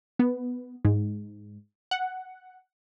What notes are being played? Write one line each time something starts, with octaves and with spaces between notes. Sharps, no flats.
B3
G#2
F#5